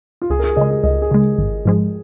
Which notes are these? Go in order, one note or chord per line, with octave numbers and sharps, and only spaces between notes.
F4
C#2 G#4
A#4
G#4
C#3 G#3 D#5
G#4
C#2 D#5
G#4
C#3 G#3
G#1
G#2 F3 G#3